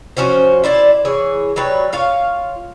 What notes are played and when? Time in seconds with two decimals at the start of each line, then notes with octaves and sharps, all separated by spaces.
0.17 F3 C#4 F#4 C5
0.64 E4 C5 D5
1.05 E3 G#4 C#5
1.56 F#3 G3 B4 C#5
1.93 F4 C#5 F5